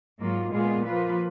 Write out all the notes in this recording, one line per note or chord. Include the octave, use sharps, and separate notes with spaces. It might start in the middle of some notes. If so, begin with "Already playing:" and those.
G#2 F#3 A#3 F4
A#2 G#3 B3 F4 G#4
F3 A#3 F4 B4